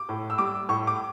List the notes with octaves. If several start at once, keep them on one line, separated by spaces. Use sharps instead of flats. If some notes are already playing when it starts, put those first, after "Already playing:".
Already playing: D6
A2
E6
G3 D6
A2 C#6
D6